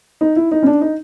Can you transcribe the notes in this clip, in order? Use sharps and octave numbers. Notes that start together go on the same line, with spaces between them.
D#4
E4
D#4
C#4
D4
D#4